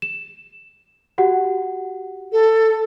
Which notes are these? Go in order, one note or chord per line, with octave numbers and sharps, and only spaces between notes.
E7
F#4 G4 F#5
A4